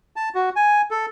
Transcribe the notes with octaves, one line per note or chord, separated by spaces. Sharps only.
A5
F#4
G#5
A4